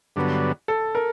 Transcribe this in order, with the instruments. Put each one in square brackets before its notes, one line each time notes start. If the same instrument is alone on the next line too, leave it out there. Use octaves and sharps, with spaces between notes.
[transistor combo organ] G2 D3 F#3 B3
[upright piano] A4
A#4